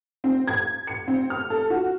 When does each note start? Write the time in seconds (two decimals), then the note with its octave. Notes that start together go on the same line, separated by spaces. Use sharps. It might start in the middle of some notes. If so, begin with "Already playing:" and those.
0.24 C4
0.48 G#6
0.87 C#7
1.08 C4
1.30 F6
1.50 A4
1.70 F#4